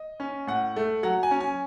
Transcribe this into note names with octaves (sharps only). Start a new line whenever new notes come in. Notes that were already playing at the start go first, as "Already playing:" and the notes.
Already playing: D#5
C#4
A2 F#5
A3
F#3 F#5
G#5
C#4
G#5